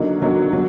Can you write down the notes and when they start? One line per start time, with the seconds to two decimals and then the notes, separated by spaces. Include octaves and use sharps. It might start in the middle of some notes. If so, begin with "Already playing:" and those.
Already playing: D3 F#3 A#3 D#4
0.21 D3 F#3 A#3 D#4
0.53 F#3